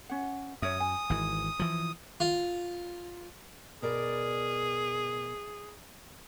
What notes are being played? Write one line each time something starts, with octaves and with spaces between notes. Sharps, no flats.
C#4 F#5
F#2 C#5 E5 D#6
G#5
G#1 E3
E3 F3
F4
B2 G#4 A#4 D5